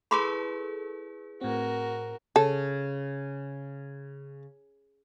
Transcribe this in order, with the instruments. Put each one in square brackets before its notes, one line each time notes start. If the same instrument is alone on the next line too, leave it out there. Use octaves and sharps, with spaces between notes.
[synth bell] E4 G#4 B4 [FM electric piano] A4 [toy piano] B5 C6 D6
[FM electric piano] A2 C4 [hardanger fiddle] F#4 A#4
[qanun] C#3 [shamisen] A4